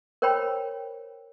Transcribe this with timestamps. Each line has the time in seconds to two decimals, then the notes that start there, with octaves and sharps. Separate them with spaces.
0.22 A#4 C5 C#5 G5 B5